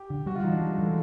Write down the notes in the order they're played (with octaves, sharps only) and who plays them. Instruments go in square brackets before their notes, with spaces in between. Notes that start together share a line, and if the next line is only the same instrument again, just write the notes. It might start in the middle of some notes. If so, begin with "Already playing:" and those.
Already playing: [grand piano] G4
[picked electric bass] D3
[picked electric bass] G3 [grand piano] F#4
[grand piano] F4
[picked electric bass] E3 [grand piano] D#4
[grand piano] D4
[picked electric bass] G3
[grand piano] A3
[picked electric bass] E3
[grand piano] G#3